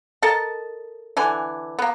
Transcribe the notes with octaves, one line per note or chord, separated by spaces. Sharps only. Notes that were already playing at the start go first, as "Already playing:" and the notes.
A4 A#4 D#5 A5
D3 E3 G#5
A#3 B3